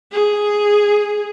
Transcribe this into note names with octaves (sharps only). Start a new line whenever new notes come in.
G#4